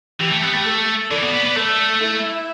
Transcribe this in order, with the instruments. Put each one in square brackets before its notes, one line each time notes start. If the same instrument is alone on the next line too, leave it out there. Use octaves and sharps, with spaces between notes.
[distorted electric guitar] E3 [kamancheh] G4
[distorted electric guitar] A3
B3
A3
[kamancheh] A4
[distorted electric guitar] E3 [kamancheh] D5
[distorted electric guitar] B2
B3
B3
[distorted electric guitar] A3 [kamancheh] A4
[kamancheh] E4